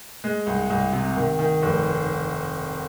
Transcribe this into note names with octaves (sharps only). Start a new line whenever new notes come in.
G#3
C2
C2
C3
D#3
D#3
F1